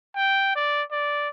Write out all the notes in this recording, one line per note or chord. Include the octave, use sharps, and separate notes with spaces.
G5
D5
D5